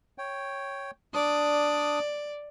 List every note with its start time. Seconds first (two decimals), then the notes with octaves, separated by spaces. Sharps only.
0.18 C#5 G5
1.14 D4 D5 D#6